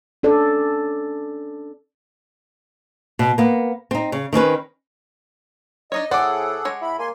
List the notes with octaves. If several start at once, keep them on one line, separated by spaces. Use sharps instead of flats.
C#4 D4 A4 D5
B2
A#3 B3
C4 D#4
C#3
D#3 C4 C#4 B4
D4 D#4 C#5 D#5
A2 G#4 A4 C5 D5 F#5 D6
G#3 C#5
E4 B5
A#3 G#5 C6